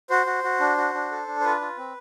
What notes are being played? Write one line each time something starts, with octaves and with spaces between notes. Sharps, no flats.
F#4 C5
F#4
F#4
D4
F#4
D4
A4
D4
C5
F4 B4
F4
C4